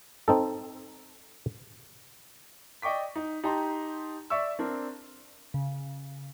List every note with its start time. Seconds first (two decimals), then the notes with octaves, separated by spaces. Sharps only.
0.28 C4 D#4 A4
2.82 D5 D#5 G5 C#6 D6 B6
3.16 D#4
3.44 D#4 G4 G5 A5 A#5 C6
4.30 D5 E5 C#6 E6
4.59 C4 D4 A#4
5.54 C#3